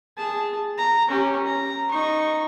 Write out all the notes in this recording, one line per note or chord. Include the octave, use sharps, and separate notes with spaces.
G#4 A5
A#5
C#4 G4
A#5
D#4 C#6